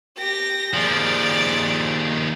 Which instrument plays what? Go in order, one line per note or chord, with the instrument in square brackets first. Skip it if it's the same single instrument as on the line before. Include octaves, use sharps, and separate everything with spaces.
[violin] G4 A#6
[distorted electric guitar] D#2 F3 [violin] G#4 D5